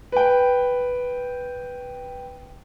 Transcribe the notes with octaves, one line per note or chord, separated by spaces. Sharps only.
B4 G5